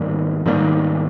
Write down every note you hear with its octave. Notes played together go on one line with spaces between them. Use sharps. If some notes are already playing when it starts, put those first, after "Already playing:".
Already playing: G#2 D#3 G3 A#3
G#2 D#3 G3 A#3